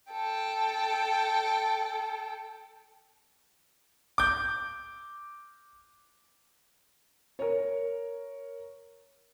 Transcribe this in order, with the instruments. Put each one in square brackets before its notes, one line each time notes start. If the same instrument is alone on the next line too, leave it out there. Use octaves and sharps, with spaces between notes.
[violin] A4 G5
[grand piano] D6 G6
[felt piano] A#4 C#5